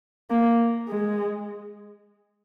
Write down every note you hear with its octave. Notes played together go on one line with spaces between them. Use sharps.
A#3
G#3